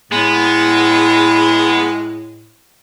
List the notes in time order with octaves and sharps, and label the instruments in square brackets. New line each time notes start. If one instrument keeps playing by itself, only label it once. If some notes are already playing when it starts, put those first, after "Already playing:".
[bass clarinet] A2 [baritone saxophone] G#3 [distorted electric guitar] B3